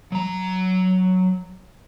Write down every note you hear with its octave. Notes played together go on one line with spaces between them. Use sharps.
F#3 A#5